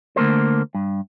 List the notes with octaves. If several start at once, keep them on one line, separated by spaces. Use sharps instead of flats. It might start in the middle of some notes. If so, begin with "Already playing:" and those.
D3 A3 A#3 A#4 C5
G2